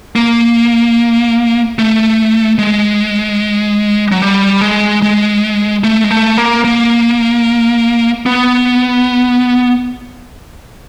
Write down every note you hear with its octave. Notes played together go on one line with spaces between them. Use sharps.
A#3
A3
G#3
F#3
G3
G#3
G#3
A3
G#3
A3
A#3
A#3
B3